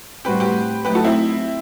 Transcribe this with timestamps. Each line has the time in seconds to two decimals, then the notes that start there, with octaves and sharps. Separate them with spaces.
0.25 A2 G3 C4 F#4 G4 B4
0.40 G4 B4
0.84 F#3 A3 D#4 G4 B4
0.95 F#4 A4
1.04 C4 E4